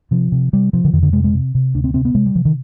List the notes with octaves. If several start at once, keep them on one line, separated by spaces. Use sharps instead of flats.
C3 F3
C3
C3 G3
C3 F3
D3
F2 D#3
D3
C3 G#3
G#3
C3
C3
D2 D4
C4
C3 C4
B3
C3 G#3
G3
C3 F3
D#3